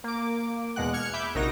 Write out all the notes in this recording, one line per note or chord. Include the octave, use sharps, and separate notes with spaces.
A#3 D6
E2 B2 G#3 F#5 F#6
F6 G#6 C#7
E5 B5 D6 G6
A#1 C3 D#4 F#4 A#4 A#6